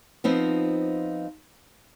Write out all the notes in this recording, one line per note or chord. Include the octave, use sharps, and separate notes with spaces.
F3 B3 C4 D#4 F4